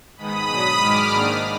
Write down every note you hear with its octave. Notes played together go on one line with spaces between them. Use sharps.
G#2 D#3 G#3 B3 B5 D#6
B2 F#3 D4
G#2 D#3 G#3 D6 F6
G#2 D#3 A#3 D4